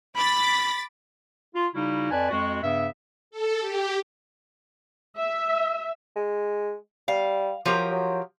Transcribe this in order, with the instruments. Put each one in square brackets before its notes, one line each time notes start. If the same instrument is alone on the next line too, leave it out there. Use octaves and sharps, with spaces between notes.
[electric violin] B5 [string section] D6 A6 B6
[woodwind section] F4
C#3 G3 D#4 E4 F#4
F2 B4 D5 G#5 A5
F2 G#3 F#4
G2 C#3 B3 E5
[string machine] A4
G4
[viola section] E5
[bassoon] G#3
[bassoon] G3 [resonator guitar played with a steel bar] F5
[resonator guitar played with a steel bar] F3 G4 A#4 [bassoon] F#3
[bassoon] F#3